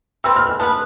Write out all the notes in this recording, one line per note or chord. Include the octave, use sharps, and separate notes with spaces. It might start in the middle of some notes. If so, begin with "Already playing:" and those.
E3 G3 C4 E6
F6
F6
B3 F4 B4 A5